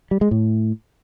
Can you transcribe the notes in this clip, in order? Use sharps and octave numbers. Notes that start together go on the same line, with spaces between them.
G3
G#3
A2